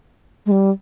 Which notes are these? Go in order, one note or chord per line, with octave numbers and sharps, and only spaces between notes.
G#3
G3